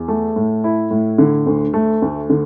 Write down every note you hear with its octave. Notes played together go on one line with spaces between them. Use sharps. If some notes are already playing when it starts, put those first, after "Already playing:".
Already playing: E2
A3
A2
E4
A2
D3
D2
A3
D2
D3